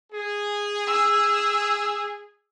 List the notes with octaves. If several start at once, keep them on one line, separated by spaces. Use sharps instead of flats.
G#4
E6